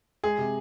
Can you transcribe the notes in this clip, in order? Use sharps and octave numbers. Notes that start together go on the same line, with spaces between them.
G#3 G#4
C3